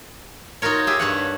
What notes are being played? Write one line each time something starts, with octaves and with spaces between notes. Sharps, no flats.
D#4 F4 F#4 A#4 C#5
G4 G#4 E5
G2 C#5 F#5